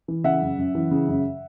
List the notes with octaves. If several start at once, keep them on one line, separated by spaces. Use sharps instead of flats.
E3
C#3 E5 F#5
F#2
F#2
E3
C#3
F#2